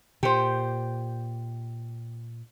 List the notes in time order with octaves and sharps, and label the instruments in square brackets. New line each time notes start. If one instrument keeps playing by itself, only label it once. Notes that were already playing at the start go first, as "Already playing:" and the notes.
[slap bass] A#2 [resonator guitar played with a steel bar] G4 C5